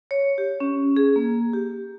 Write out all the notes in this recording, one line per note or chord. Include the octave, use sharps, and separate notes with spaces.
C#5
G4
C#4
G#4
A#3
G4